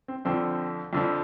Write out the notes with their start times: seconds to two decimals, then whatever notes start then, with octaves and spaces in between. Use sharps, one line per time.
0.08 C4
0.25 F2 D3 F3 C4
0.93 F2 D3 F3